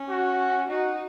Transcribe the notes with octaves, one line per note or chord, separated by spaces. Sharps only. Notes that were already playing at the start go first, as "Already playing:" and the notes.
Already playing: C#4
F#4
D#4 F#4